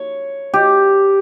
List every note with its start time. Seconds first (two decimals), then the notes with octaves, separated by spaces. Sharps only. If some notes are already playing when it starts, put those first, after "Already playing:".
Already playing: C#5
0.54 G4